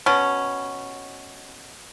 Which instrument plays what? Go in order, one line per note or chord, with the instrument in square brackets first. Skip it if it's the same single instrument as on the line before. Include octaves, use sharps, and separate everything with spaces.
[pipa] B2 C#4